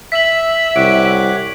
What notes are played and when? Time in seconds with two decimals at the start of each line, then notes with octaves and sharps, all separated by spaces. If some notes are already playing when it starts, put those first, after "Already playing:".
0.12 E5 B6 F#7
0.76 C2 C#5 F#5 D6 D7